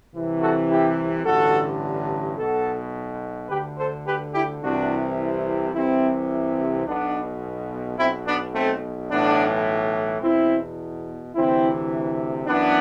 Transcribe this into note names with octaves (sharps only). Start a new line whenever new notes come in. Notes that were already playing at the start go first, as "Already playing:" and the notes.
C2 C3 E3
F#4 A4
E4 G4
A1 G2 D3 F#4 A4
B1 B2 F#4 A4
D2 D3 G4 B4
A4 C5
G4 B4
E4 G4
C2 C3 E3 D4 F#4
C2 C3 E3 C4 E4
B1 B2 B3 D4
B1 B2 C4 E4
B3 D4
A3 C4
B1 A2 E3 B3 D4
E2 B2 C4 E4
D2 C3 E3 C4 E4
F#2 E3 B3 D4